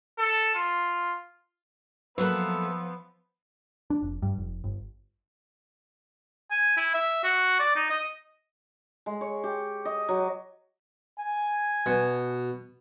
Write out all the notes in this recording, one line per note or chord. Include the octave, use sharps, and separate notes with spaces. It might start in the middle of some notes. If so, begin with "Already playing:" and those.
A4
F4
F3 F#3 A#3 B3 A4 B4 E5
D4
F1
G2
F1
G1
G#5
E4
E5
F#4
D5
D#4
D#5
G#3
C#5
G4
D#5
F#3
G#5
B2